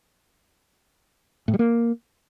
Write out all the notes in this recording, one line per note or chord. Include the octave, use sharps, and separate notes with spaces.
A2
G3
A#3